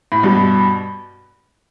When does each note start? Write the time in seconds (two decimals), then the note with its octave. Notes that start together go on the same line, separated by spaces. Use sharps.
0.12 A2
0.23 G2 B2